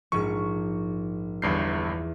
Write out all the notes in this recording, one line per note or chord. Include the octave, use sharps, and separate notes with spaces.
A#1 G#2 C#6
G1 E2 G2 G6 C7